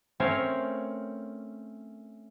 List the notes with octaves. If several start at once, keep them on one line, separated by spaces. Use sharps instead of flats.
A3 C4 C#4 A#4 C#5 F5